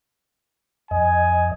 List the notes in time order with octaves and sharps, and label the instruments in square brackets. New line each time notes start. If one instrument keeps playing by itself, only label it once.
[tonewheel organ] F2 D#5 [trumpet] G#5